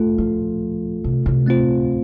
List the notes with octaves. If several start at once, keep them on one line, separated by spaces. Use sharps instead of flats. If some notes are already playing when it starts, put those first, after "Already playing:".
Already playing: A3 F4 A4
F3
C3
C3
A3 C4 F4 C5